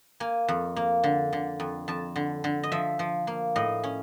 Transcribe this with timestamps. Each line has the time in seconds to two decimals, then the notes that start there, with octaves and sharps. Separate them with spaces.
0.20 A#3 G#5
0.48 F2
0.76 A#3
1.04 D3
1.33 D3
1.60 F2
1.88 F2 A5
2.16 D3
2.44 D3
2.63 D#5
2.72 F3 E5
2.99 F3
3.27 A#3
3.56 A2 D#5
3.84 C#4